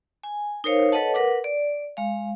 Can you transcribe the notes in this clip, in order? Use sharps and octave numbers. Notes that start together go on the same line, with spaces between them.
G#5
D#4 A#4 C5 C#5 F5
A4 B4 C#5 D#5 F#5 A5
A#4 B4 F#5 D6
D5
G#3 F5